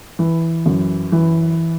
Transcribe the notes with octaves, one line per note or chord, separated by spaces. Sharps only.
E3
F#2
E3